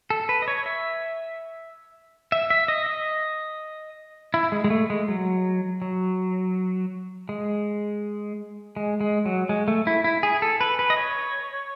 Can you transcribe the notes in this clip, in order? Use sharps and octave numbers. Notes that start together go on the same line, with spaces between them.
A4
B4
D#5
C#5
E5
E5
E5
D#5
D#5
E4
G#3
G#3
A3
G#3
F#3
F#3
G#3
G#3
G#3
F#3
G#3
A3
E4
E4
G#4
A4
B4
B4
D#5
C#5